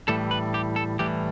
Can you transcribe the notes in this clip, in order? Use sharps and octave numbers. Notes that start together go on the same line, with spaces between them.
A2 E3 G3 A4
B4
G4
A4
A2 E3 G3 G4